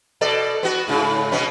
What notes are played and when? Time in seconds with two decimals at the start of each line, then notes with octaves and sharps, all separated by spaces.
0.21 B2 A4 D5
0.63 B3 F#4
0.88 G#2 C#3
1.32 B2 B3 C#4